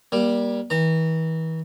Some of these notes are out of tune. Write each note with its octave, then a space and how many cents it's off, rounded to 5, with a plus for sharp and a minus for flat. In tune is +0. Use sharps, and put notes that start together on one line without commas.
G3 +0 A#3 +30
E3 -40 A#5 -30